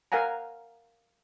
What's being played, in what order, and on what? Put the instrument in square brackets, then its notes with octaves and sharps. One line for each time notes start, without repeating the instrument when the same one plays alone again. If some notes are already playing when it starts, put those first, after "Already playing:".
[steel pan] A#4 F5 F#5 G#5 A#5